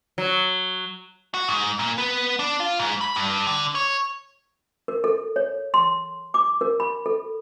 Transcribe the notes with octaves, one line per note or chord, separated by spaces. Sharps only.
F#3
F#4
G#2
A#2
B3
D4
F4
G#2
B5
G2
D3
C#5
A#4
A4
C#5
C6
D6
A#4
B5
A4